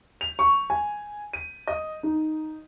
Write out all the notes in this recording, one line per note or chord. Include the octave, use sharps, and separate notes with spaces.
F7
C#6
G#5
D#7
D#5
D#4